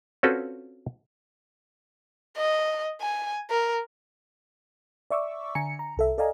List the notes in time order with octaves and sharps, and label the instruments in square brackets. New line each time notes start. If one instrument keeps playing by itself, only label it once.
[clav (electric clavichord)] C4 C#4 F4 F#4 A4 B4
[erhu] D#5
G#5
A#4
[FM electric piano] D5 E5 C#6 D6 E6
D3 G#5 A#5 C#7
A#5
C2 A4 E5
A4 D5 D#5 F5 G#5 A#5